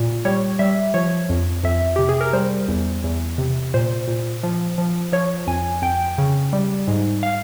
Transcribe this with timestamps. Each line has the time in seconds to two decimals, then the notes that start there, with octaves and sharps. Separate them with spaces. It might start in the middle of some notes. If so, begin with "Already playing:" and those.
Already playing: A#2
0.25 G3 C#5
0.59 G3 E5
0.94 F3 C#5
1.29 F2
1.64 F2 E5
1.96 C3 G4
2.09 G#4
2.21 A#4
2.33 G3 C5
2.68 E2
3.04 E2
3.38 C3
3.74 A#2 C5
4.08 A#2
4.43 F3
4.78 F3
5.12 F3 C#5
5.47 F2 G#5
5.82 F2 G5
6.18 C#3
6.53 G3
6.88 G#2
7.23 F5